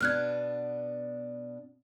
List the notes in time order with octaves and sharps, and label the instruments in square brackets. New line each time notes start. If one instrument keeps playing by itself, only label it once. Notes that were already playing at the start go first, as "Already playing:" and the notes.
[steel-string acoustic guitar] B2 B3 D4 [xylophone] F6 F#6 G#6